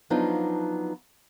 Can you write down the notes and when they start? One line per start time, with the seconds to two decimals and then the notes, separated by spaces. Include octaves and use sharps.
0.10 F3 F#3 B3 D4 D#4 F4